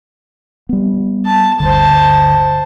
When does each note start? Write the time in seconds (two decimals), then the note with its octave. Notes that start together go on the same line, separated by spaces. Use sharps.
0.69 G3 B3
1.25 A5
1.60 G1 D2 D3 C5 A5